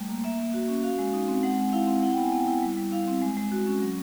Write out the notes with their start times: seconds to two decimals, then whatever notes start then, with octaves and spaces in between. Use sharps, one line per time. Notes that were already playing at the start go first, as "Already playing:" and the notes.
Already playing: G3 A3
0.09 A#3
0.24 A#3 E5
0.39 A#3
0.54 F#4
0.68 C#4
0.83 F#4 F5
0.98 G#3
1.13 D#4
1.28 C4
1.43 G#3 F#5
1.58 G#3
1.73 E4 F5
1.88 C4
2.03 E4 F#5
2.13 G5
2.17 B3
2.23 G#5
2.32 B3 G5
2.48 E4
2.63 G3
2.77 G3
2.92 E4 F5
3.08 C4
3.22 G#3
3.37 G#3
3.52 F#4
3.67 C#4
3.82 F#3